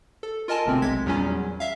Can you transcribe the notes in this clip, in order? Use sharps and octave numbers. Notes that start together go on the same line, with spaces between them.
A4
F4 A#4 D#5 G#5 A5
G1 D2 C3 C4
B1 G#3 G#6 B6
E2 A#2 F#3 G3 C#4
E5 F5